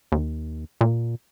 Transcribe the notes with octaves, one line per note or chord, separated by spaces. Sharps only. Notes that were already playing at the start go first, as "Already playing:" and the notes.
D#2
A#2